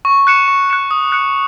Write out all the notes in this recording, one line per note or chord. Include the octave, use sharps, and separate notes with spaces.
C#6
F#6 C#7 E7
C#6
F#6 C#7 E7
D#6
F#6 C#7